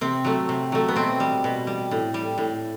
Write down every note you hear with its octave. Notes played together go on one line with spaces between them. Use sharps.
C3 C4
F#3 A3
C3
F#3 A3
B3
B2 C4
G3
B2
G3
A2
G3
A2